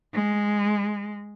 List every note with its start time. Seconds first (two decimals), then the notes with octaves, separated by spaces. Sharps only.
0.13 G#3